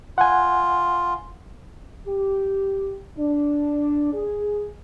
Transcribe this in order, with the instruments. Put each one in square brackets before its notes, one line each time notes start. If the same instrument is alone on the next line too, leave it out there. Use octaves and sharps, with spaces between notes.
[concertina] F4 [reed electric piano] F#5 G#5
[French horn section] G4
D4
G#4